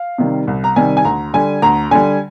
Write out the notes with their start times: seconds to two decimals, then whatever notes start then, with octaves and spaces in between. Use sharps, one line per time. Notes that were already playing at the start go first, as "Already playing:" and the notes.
Already playing: F5
0.18 C3 D#3 G3
0.47 C2
0.64 A#5
0.76 C3 D#3 G3 G#5
0.97 G#5
1.05 D2 A#5
1.33 D3 G3 G#5
1.62 D2 A#5
1.91 D3 G3 G#5